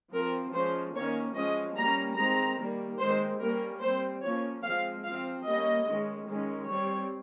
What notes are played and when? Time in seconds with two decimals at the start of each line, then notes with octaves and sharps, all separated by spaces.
0.12 F3 C4 A#4
0.53 F3 G#3 C#4 C5
0.94 D#3 A#3 C#4 C#5
1.35 F3 G#3 C#4 D#5
1.77 G3 A#3 C#4 A#5
2.17 D#3 G#3 C4 A#5
2.59 D#3 G3 A#3
3.00 D#3 G#3 C4 C5
3.41 G3 A#3 C#4 A#4
3.82 G3 C4 C5
4.23 F3 A#3 C#4 C#5
4.64 F3 G#3 C4 F5
5.05 F3 C4 F5
5.46 G3 A#3 C#4 D#5
5.88 D#3 G#3 C#4
6.28 D#3 G#3 C#4
6.69 G3 C4 C#5